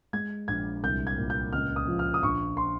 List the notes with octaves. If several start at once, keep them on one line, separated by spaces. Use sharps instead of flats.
G#3 G#6
A#1 G#6
C2 G6
G#6
A#2
G6
C#2 F6
D#6
F3
F6
D#6
A#1 C#6
C6